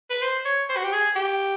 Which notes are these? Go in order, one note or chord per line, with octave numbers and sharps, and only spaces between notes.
B4
C5
C#5
C5
F#4
G4
G#4
G4